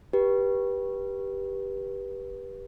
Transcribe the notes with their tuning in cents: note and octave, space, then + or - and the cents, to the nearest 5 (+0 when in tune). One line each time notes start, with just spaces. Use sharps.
G4 +0 B4 -25